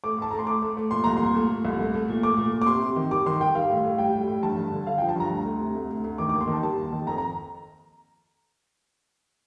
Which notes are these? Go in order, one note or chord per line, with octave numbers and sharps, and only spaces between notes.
A3 D6
A2 A5
A3 A#5
C6
A3 D6
A3
A3
A#2 C6
C2 A#5
A#2 C6
A3
A#2
C2
A3
A3
A#2
A3 D6
A#2
A#2
D6
C3 C6
C3
D#3
G3 D6
D#3 C6
D#3 G5
G3 F5
A2
A2
G3 G5
G3
A2
G2 A5
G2
D3
D3 F5
F3 G5
A5
G2 A#5
D2
D2
C3
D2
D2
D2
D#3 D6
D#2 D6
C6
D#3 A5
G3 A5
D#2
D#3
F2 A#5
A#5